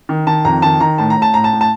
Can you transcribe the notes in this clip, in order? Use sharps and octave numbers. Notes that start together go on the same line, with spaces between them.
D#3
D#3 A5
F2 A#5
D#3 A5
D#3 A#5
A2 A5
A#5
A2
A5
A2 A#5
A5
A2
A5